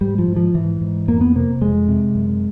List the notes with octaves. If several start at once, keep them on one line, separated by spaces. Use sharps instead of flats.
G#2 G3
F3
G#2
F3
G#2 E3
G#2
F2 A#3
B3
C3 A#3
F2 G#3
C3
F#2